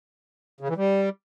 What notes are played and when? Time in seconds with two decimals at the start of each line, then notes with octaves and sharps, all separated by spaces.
0.61 C#3
0.69 E3
0.77 G3